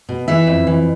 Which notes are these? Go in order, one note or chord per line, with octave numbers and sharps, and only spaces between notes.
B2
E3 E5
F2
E3